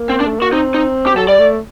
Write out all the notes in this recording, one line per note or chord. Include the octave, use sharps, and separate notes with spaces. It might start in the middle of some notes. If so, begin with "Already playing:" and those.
Already playing: A#3
C4
D4
A3
A#3 F#4
C4 D#4
D#4
G4
F#3 A4
G3 D5
A3